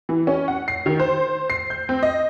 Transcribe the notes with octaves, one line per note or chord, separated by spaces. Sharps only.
E3
C#4
F#5
C7
D#3
C5
C7
G6
C4
D#5